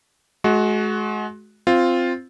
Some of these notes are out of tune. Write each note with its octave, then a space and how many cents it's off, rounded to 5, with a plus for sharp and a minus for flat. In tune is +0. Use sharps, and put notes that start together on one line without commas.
G#3 +35 F#4 +0
C4 +0 F4 +0